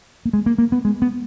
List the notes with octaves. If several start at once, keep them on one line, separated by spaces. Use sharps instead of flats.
A#3
G#3
A#3
A#3
B3
G#3
B3